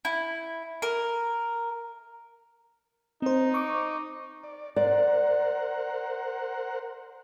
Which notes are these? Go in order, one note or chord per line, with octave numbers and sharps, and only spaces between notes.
E4
A#4
C4 D#4 C5
C#6 D6
D5
A#4 C5 D5 F#5